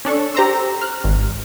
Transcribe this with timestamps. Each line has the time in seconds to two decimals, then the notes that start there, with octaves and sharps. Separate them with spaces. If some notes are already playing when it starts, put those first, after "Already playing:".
0.05 C#4 D4 A4 C#6
0.35 G4 C5 A#5 C6 E6
0.82 F6 F#6
1.04 G#1